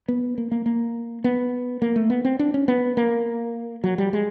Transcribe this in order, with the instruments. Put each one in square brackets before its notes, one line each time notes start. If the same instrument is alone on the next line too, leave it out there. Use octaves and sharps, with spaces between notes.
[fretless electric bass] B3
A#3
A#3
A#3
B3
A#3
A3
B3
C4
D4
C#4
B3
A#3
F#3
G3
G#3